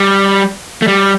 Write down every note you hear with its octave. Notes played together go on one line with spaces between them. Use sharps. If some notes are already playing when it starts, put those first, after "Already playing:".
Already playing: G3
A3
G3